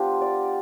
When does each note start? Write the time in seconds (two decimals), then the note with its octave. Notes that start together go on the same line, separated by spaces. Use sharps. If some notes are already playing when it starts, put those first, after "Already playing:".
Already playing: F3 B3 D4 F4 G4
0.21 D5